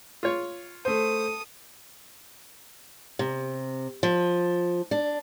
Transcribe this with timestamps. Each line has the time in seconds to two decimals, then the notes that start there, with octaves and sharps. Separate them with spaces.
0.23 F4 C#5
0.85 A3 A4 C5 D#6
3.19 C3
4.03 F3
4.91 D4